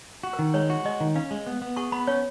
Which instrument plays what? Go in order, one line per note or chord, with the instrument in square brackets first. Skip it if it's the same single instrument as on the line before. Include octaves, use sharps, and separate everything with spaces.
[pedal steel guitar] F#4
[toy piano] A#4
[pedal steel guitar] D#3
[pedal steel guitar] G#3 [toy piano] C#5
[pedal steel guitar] F#4
[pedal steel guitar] G#3 [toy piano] D#5
[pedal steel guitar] D#3
[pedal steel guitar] C#4 [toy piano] F5
[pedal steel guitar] G#3
B3
B3
[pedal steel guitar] G#4 [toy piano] C#6
[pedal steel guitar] B3 [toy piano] B5
[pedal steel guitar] C#4 [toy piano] C#5